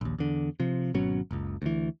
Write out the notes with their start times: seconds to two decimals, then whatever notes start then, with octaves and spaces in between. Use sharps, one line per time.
0.01 A#1 D#2
0.19 E2 D3
0.60 C3 F3
0.94 G#1 B2 F#3 C#4
1.31 F#1 C#2
1.62 D2 E3